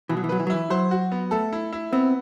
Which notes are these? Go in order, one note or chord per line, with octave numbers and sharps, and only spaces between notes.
B2 E3
F#3
E3
F#3 B4
E3
F#3
E3 E4
F#3 C5
F#4
B3
A3 A4
E4
E4
B3 C4